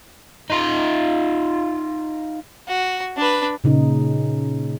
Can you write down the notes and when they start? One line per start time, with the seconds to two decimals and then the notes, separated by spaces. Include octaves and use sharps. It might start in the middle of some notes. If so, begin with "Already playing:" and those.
0.50 D#4 F4
2.68 F#4
3.17 D4 B4
3.64 A#2 C#3 D#4